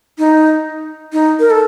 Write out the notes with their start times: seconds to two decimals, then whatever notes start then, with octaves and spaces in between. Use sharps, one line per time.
0.19 D#4
1.13 D#4
1.40 A#4
1.50 A4